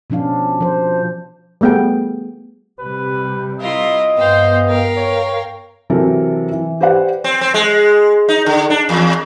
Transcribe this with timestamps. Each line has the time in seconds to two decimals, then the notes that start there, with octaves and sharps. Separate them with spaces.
0.10 B2 F3 C#4 D4 F5
0.61 F3 C5
1.61 G3 A3 B3 G#4 G5
2.80 C3 G3 B4
3.59 E4 F4 A#4 D#5
4.16 G2 B3 C5 F5 G5
4.68 A#4 F5 G5
4.97 C#5
5.90 C3 E3 F#3 C4 A4 A#4
6.52 E3
6.81 G4 B4 C5 D5 F#5
7.24 C4
7.41 C4
7.54 G#3
8.29 D#4
8.46 D3
8.70 D4
8.89 E2